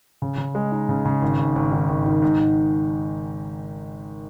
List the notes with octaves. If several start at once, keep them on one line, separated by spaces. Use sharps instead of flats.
C#3
C#3
G#3
D#4
C#3
C#3
G#1
G#2
G#1
D#3
G#1
D#3
G#2
G#2